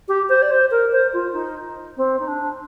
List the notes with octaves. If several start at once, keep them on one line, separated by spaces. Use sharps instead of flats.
G4
C5
D5
C5
A#4
C5
F4
D#4
C4
D#4
D4